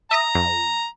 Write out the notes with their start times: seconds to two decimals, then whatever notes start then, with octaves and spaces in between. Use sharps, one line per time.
0.11 E5 A#5 D#6 A#6
0.35 F2